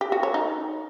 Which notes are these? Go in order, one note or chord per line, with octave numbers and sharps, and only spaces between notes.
G4
F#4
C#5
D#4